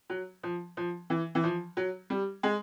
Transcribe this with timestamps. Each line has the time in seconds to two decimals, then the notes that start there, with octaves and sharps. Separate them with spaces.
0.10 F#3
0.43 F3
0.77 F3
1.10 E3
1.35 E3
1.44 F3
1.77 F#3
2.10 G3
2.43 G#3